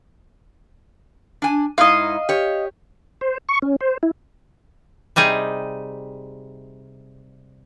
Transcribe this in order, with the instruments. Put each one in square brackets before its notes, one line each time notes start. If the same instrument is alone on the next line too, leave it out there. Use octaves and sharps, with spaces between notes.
[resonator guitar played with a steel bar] D4 G#5
[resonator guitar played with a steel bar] G#2 D#4 E4 [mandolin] D#5 F5
[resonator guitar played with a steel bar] G4 C#5
[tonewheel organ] C5
C#6
C#4
C5
E4
[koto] C3 G3 D#4 G#4